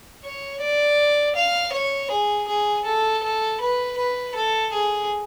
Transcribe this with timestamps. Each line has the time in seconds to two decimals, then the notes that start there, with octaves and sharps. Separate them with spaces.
0.24 C#5
0.61 D5
1.35 F5
1.72 C#5
2.11 G#4
2.47 G#4
2.85 A4
3.23 A4
3.60 B4
3.97 B4
4.35 A4
4.72 G#4